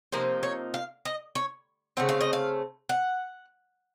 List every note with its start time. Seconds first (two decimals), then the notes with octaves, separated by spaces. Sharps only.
0.12 C3 F3 A#3 D#4 C5
0.43 C#5
0.74 F5
1.05 D#5
1.35 C#5
1.97 C#3 A3 C4 F#5
2.09 F5
2.21 D#5
2.33 F5
2.89 F#5